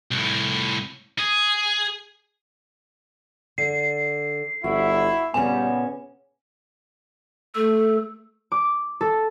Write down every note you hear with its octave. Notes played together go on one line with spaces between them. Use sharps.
C2 A2
G#4
D3 C7
G1 E4 F#4 E5
A#2 C#3 G3 B3 C#4 G#5
A3 A4
D6
A4